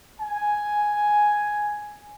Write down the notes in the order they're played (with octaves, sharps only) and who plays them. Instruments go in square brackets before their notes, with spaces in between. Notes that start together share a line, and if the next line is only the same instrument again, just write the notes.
[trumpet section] G#5